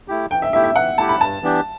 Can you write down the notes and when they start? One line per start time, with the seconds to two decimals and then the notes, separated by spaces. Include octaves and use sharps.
0.08 A3 E4 G4
0.31 E3 G5
0.42 E5
0.53 A3 E4 G4 E5
0.64 E5
0.76 E3 F#5
0.98 A3 E4 G4 A5
1.09 B5
1.21 G2 A5
1.43 E3 B3 D4 G4